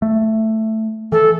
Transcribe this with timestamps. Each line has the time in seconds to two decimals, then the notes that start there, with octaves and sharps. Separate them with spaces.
0.02 A3
1.12 E3 A4